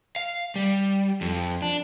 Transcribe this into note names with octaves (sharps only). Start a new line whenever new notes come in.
F5
G3
F2
D4